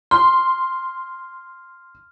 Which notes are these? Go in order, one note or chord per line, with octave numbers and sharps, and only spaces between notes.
C6 F6